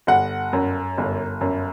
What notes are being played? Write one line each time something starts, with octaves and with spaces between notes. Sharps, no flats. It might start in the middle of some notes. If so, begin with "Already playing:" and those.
G1 F#5
F#2
G1
F#2